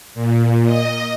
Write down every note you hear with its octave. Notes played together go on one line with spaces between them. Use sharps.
A#2
D#5